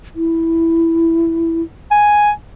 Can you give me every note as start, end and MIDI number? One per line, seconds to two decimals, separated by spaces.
0.16 1.62 64
1.91 2.31 80